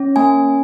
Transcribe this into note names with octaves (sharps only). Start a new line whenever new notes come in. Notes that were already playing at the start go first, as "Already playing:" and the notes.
Already playing: C#4
A#3 G#5